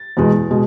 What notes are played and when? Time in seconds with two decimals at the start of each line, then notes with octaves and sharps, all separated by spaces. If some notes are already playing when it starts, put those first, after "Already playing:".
Already playing: A6
0.17 E2 B2 G#3
0.51 B2 G#3